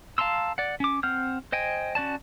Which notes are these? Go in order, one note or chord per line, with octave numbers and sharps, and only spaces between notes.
F5 A5 A#5 C6 E6
D5 F#5
C#4 D6
C4 F#5 F6 G6
C5 D#5 G5 G#5
C#4 F#4 D5 A5